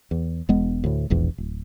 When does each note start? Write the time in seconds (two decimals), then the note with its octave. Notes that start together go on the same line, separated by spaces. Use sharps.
0.11 E2
0.49 E1 G#3 B3
0.84 D2 A2
1.10 E1 A#1 E2
1.38 D1